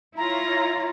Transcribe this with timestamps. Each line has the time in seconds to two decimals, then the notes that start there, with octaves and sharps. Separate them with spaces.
0.17 E4 F4 C#5 A#5